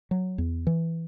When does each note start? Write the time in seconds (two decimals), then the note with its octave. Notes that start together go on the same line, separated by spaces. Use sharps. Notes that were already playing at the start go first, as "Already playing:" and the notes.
0.11 F#3
0.38 E2
0.67 E3